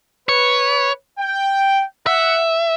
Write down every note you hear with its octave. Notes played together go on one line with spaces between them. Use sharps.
B4 C#5
G5
E5 F#5